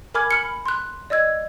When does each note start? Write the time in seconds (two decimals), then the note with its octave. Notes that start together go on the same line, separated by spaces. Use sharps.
0.14 A#4 G#5 B5 D6 F6 G#6
0.31 B5 F6 C#7
0.66 C6 F#6
1.10 D5 D#5 E6 G#6